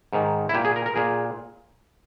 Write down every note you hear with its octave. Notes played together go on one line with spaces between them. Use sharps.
G#2 D#3
E4
A#2 G4
G#4
A#4
A#4
A#2 G#4